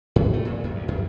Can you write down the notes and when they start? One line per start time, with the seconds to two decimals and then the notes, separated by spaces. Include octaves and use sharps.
0.16 G#2
0.33 A3
0.45 A#2
0.64 F#2
0.75 D2
0.88 F#2